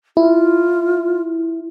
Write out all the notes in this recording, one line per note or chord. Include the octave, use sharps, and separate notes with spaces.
E4 F4